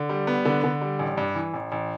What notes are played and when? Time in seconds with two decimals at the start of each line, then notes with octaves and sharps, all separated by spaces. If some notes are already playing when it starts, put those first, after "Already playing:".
Already playing: D3
0.09 G3
0.27 B3
0.45 D3
0.64 D3
0.81 G3
0.99 A1
1.17 G2
1.35 E3
1.54 A1
1.72 A1